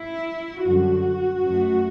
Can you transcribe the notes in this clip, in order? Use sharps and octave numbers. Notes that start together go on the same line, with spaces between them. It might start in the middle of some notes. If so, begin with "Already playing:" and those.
Already playing: E4
F#2 D3 G3 F#4
F#2 F#3 A3